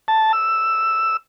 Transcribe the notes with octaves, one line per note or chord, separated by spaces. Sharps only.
A5
E6